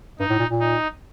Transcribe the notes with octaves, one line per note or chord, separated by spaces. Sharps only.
G2 D#4
A2
A#2
A#2
D#4